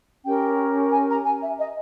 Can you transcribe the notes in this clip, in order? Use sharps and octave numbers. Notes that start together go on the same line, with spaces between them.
C#4 G4 A#4 G5
G#5
A#5
G#5
E5
D#5